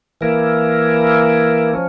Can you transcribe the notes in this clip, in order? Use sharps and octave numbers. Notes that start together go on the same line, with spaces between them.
E3 A#3 E4 A#4
F3 C#4